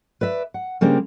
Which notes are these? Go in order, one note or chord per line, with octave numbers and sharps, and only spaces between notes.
B4 D5 E5
F#5
C#3 G3 A#3 C4 D4